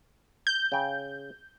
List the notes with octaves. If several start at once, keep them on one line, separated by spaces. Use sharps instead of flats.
G6
C#3 G5